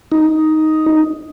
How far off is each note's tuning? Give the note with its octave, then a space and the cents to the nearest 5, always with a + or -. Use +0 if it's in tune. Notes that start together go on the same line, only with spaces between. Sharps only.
D#4 +5